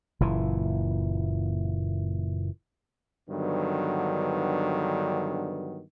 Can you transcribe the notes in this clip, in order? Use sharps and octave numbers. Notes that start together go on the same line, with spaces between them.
F#1 A#2 E3
G2 D3 D#3 F#3 B3